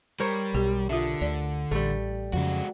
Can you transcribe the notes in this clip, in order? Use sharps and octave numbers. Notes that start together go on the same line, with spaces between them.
G3 A#4 C5 C#5
B1 G4
D3 F4 E5
D2 D5
A1 G3 A3
F2 C#3 G#3 F#4